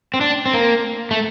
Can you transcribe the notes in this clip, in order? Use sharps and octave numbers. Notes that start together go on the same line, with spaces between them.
C4
D4
C4
A#3
A3